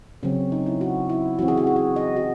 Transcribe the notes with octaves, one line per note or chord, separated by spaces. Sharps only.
C#3 F#3 C4 C#4
D#4
E4
F#4
E4
E3 C4 F#4
G#4
F#4
G#4
F#4
D#5
F#4